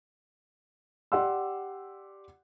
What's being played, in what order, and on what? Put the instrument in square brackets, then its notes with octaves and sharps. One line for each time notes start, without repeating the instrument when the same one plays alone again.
[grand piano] G4 D5 F#5 C6 E6